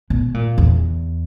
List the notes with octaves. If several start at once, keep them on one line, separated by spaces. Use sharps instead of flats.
B2
A#2
E2